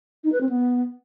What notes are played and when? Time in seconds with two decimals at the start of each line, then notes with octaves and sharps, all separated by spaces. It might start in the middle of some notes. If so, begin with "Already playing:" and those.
0.24 D#4
0.32 B4
0.41 C4
0.49 B3